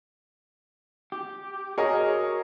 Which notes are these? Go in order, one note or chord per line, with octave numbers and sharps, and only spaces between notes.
G4
F#4 G#4 A#4 C#5 D#5